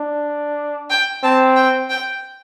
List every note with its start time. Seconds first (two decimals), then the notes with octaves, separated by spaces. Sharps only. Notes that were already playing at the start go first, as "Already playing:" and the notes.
Already playing: D4
0.90 G5
1.23 C4 A5
1.56 G5
1.90 G5